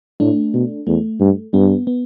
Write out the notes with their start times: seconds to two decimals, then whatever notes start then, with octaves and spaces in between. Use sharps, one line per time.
0.20 A2 A3 D4
0.54 B2
0.87 E2 A3
1.20 G2
1.53 G2 B3
1.87 B3